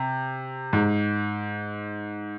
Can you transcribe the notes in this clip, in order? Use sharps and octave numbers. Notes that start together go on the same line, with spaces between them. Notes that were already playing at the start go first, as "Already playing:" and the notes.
Already playing: C3
G#2